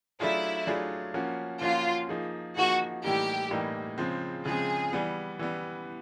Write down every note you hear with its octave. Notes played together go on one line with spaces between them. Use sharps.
F#3 A3 D4 E4 F4 G#4
F#3 A3 D4 F4 G#4
F3 A#3 C#4 F#4
F3 A#3 C#4 F4 F#4
F3 A#3 D#4 G#4
F3 A#3 D#4 F#4 G#4
A2 E3 G3 A#3 D#4 G4
A2 E3 G3 A#3 D#4
C#3 F3 G#3 C4
C#3 F3 G#3 C4 G#4
E3 G3 B3
E3 G3 B3